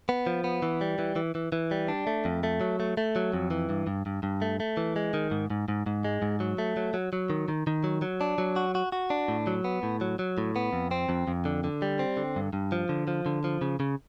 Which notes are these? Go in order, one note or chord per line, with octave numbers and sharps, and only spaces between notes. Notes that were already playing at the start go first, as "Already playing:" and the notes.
B3
F3
B3
E3
G3
E3
E3
E3
E3
G3
D4
A3
F2
A3
F#3
A3
A3
F#3
F2
E3
G2
G2
G2
G2
A3
A3
E3
G#3
D#3
G#2
G#2
G#2
G#2
G#3
G#2
F#3
A3
F#3
F#3
F#3
D#3
D#3
D#3
F#3
F#3
D4
F#3
F#4
F#4
F#4
D4
A2
F#3
B3
A2
F#3
F#3
A2
B3
F2
C4
F2
F2
D3
D3
G3
C4
D3
G2
G2
F3
D3
F3
D3
F3
C#3
C#3